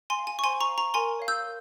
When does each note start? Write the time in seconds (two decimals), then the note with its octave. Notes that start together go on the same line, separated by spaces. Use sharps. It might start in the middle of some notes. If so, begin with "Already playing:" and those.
0.10 G#5 C6
0.19 F5
0.27 G#5
0.39 C#6
0.44 C5 G#5 C6
0.60 A#5 C#6
0.68 F5
0.78 A#5 C#6
0.94 A#4 G#5 C6
1.19 C#5 F5
1.28 E6 G6
1.44 A#4